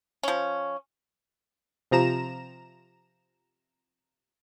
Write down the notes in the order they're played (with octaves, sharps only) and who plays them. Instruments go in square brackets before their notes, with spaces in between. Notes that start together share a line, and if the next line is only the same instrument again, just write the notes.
[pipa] F3 C#4
[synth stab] C3 F3 A#5 E7